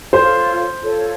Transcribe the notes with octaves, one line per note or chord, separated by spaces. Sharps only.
F4 A4 C5 C#5
F4 A4 C#5